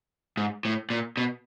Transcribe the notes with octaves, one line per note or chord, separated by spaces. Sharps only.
G#2
A2
A#2
B2